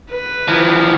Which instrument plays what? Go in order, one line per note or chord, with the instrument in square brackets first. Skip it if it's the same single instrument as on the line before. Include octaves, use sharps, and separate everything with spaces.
[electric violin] B4
[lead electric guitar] E3 F3